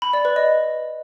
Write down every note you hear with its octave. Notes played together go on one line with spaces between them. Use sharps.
B5
D5
B4
D#5